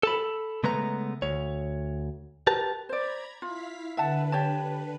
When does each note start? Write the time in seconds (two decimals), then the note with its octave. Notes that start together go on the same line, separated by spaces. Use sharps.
0.03 A4 A5 B5
0.63 C#3 G#3 A3 B3 B4 A#5
1.22 D2 C#5
2.47 G4 A#4 B4 A5
2.89 C5 D5 A#5 B5 G#6
3.42 E4 F4 F5 B6
3.97 D3 B4 E5 F#5 A5
4.32 G4 C#5 A5